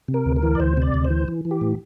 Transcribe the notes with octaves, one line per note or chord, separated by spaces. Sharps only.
C3
A#4
D2
A#4
E3
D5
D2 C5
C3 D5
D2
C5
E3
E3
E3
G4
A2